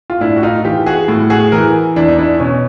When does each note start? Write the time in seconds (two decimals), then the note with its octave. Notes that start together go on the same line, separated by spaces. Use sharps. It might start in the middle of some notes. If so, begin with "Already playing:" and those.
0.10 F4
0.21 A2 D4 E4
0.37 F#4
0.43 D#4 F4
0.65 E3 F4 G4
0.86 F#4 G#4
1.08 A2
1.30 F#4 G#4
1.52 E3 G#4 A#4
1.96 E2 D4 E4
2.08 D#4
2.18 D4 E4
2.40 B2 C#4